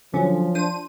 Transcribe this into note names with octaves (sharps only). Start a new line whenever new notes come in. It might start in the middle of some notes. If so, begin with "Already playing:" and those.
D3 F3 F#3 C#4
D4 C5 D#7